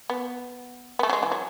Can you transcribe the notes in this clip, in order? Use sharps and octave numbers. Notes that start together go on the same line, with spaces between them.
B3
B3
A3
F#3
G#3
E3
F#3